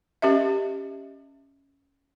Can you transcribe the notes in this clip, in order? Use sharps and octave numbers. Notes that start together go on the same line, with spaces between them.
C#4 G4 D#5 E5